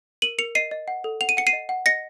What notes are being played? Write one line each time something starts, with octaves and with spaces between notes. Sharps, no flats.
A#4 D#7 F#7
A#4 C#7 F7
D#5 C7 D#7
D#5
F#5
A4
F#5 F7
D#7
F#5 C#7
C7 D#7
D#5
F#5
D#5 A#6 C#7